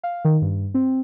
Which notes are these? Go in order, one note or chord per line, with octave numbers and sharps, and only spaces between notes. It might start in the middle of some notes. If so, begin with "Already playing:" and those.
F5
D#3
G2
C4